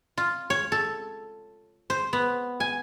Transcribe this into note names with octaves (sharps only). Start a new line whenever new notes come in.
F4
C#5
A4
C5
B3
G#5